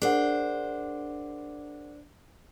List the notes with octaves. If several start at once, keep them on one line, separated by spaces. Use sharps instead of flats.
D4 G#4 A#4 C5 F#5